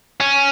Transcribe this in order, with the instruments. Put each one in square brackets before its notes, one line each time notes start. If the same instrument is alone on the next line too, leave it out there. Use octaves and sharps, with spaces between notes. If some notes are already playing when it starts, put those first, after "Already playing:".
[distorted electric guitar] C#4